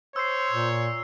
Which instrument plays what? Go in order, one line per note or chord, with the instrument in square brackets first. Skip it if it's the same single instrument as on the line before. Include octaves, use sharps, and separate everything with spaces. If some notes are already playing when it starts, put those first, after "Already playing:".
[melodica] C5 [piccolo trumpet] C#5 [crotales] E6 C7
[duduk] A#2